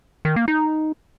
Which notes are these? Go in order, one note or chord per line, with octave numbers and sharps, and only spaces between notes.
D#3
A#3
D#4